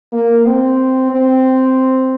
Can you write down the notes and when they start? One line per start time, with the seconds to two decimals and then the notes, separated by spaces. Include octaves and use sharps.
0.12 A#3
0.46 C4
1.11 C4